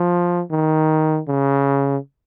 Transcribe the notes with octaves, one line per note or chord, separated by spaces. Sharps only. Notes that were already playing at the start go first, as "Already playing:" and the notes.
Already playing: F3
D#3
C#3